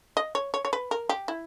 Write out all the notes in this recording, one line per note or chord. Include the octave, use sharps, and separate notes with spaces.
D#5
C#5
C#5
C#5
B4
A#4
G4
E4